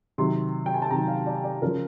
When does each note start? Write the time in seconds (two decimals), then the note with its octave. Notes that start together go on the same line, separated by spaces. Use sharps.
0.18 C3 D#3 F#3 C6
0.66 G5
0.74 G#5
0.82 A5
0.91 C3 D#3 F#3 A#5
1.08 F5
1.26 D5
1.44 D5
1.62 C#3 F3 A#4